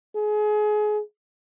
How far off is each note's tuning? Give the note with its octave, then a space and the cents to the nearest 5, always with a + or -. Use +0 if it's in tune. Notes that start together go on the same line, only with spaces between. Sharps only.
G#4 +30